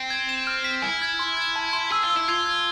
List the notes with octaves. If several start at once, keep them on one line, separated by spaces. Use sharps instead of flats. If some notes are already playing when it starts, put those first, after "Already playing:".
Already playing: C4
G#6
E7
F6
B6
E4 G#5
G#6
C6
G#6
A5
C6
G#4 E6
F4
E6
E4
F4 G#6
G#6